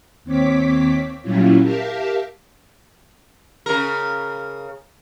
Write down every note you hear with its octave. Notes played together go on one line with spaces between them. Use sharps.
D#2 C4 C#5 D6 B6
A#2 F#3 G3 C#4 E4 F4
G4 A#4 E5 F5 A5
C#3 A#4